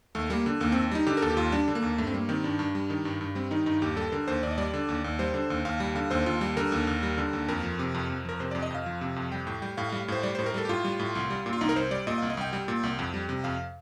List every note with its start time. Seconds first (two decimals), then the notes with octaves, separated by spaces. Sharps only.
0.15 D#2 A3
0.30 G3 A#3
0.46 D3
0.60 D#2 A#3
0.72 D#2 C4
0.91 G3 D#4
1.07 D3 G4
1.17 A#4
1.22 D#2 A4
1.30 G4
1.37 D#2 F4
1.52 G3 D4
1.68 D3
1.75 A#3
1.82 D#2
1.98 G2 A3
2.07 C4
2.14 G3 A#3
2.29 D#3 C4
2.44 G2 D4
2.59 G2
2.75 G3
2.90 D#3
3.05 G2
3.21 G2
3.35 G3 C4
3.51 D#3 D#4
3.66 G2 D#4
3.82 D#2 G4
3.97 G3 A4
4.12 D3 A#4
4.28 D#2 C5
4.43 D#2 D5
4.51 D#5
4.58 G3 D5
4.74 D3
4.89 D#2
5.04 D#2
5.19 G3 C5
5.34 D3
5.50 D#2
5.65 D#2 F5
5.80 G3
5.95 D3 F5
6.11 D#2 C5
6.26 D#2 F4
6.41 G3
6.57 D3 A#4
6.72 D#2
6.87 D#2
7.03 G3
7.18 D3
7.33 D#2
7.48 F2 A#4
7.64 F3
7.79 C3
7.94 F2
8.10 F2
8.25 F3 A#4
8.40 C3 C5
8.51 F2 D5
8.62 D#5
8.70 F2 F5
8.86 F3
9.01 C3
9.16 F2
9.32 G3 G5
9.47 A2 G5
9.62 G3 G5
9.77 A2 F5
9.89 F5
9.92 G3
10.00 F5
10.08 A2 C5
10.23 G3 D5
10.35 A2 C5
10.46 A#4
10.54 G3 A4
10.65 G4
10.69 A2 F4
10.85 G3
10.99 A2
11.15 C2
11.30 G3
11.46 A#2
11.53 F4
11.61 C2 D#4
11.69 A#4
11.76 C2 C5
11.91 G3 D5
12.07 A#2 D#5
12.18 C2 F5
12.30 D#5
12.37 C2 G5
12.53 G3
12.68 A#2
12.83 C2
12.99 F2
13.14 G3
13.29 C3
13.44 F2 F5